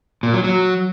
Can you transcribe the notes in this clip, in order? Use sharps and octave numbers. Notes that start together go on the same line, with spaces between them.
A#2
F#3
F#3